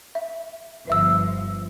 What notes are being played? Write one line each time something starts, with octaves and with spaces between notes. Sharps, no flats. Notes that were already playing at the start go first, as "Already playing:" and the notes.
E5
G1 F3 B4 E5 E6